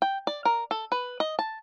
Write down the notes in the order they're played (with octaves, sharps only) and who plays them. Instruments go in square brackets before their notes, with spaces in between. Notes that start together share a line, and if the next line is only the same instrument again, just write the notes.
[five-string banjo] G5
D5
A#4
A4
B4
D#5
A5